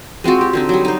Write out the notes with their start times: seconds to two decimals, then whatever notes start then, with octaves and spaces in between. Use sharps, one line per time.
0.24 G#3 C4 F4 F#4
0.41 G4
0.53 D3 C4 D#4
0.69 F#3 G3
0.85 D#4 C5